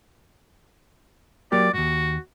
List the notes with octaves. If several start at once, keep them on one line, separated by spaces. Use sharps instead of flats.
F#3 A#3 G4 D5
D#2 G#2 F#4